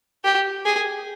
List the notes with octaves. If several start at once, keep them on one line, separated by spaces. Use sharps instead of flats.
G4
G#4